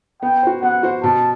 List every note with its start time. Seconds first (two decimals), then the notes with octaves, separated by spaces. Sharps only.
0.22 B3 G5
0.43 F#4 C5
0.63 B3 F#5
0.83 F#4 C5
1.04 B2 A5